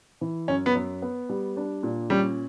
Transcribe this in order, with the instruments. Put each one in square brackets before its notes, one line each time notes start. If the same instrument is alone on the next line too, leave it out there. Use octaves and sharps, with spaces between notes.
[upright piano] E3
[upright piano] F#2 [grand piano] C#4
[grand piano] B3
[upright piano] F#2
B3
G3
D4
A#2
[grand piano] G3 [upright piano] C#4